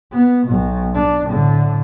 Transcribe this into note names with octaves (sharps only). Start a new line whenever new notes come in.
B3
B1 B2
D4
A2 D3